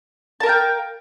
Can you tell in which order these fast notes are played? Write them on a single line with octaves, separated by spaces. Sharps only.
A5 A#4 F5 G5